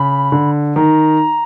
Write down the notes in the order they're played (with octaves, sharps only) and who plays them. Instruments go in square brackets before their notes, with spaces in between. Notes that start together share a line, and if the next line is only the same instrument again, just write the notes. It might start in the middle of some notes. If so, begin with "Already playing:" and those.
Already playing: [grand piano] C#3 [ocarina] B5
[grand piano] D3
[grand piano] D#3 [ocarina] A#5